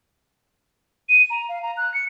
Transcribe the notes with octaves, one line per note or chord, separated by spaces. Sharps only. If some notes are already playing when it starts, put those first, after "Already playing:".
D#7
A#5
F5
A#5
F#6
C#7